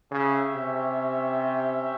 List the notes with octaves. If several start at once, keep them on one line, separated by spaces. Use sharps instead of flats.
C#3 C#4 G4 C#5 E5 G5
C3